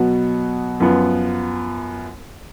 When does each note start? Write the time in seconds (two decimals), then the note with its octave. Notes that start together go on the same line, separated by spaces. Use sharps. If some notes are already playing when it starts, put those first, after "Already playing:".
Already playing: B2 F#3 B3 F#4
0.80 F#2 F3 B3 F4